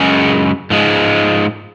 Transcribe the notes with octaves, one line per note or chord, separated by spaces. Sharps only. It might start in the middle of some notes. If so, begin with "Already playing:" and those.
Already playing: F#2 C#3 G#3 C#4
G#2 F3 G#3